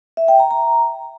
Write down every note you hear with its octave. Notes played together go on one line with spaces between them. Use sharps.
E5
G5
A#5
A#5